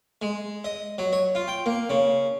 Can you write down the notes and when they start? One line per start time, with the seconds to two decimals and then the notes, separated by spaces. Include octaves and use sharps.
0.22 G#3
0.64 D#5
0.98 F#3
1.13 C#5
1.35 F4
1.48 G5
1.66 A#3
1.90 C#3